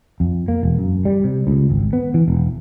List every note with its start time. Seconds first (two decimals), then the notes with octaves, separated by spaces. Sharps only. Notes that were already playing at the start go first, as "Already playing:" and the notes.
0.20 F2
0.48 A#3
0.63 E1
0.79 F#2
1.05 G3
1.24 C3
1.47 C#2
1.70 G#1
1.93 B3
2.14 E3
2.28 E1